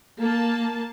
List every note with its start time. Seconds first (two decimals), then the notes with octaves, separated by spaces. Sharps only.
0.21 A#3 A5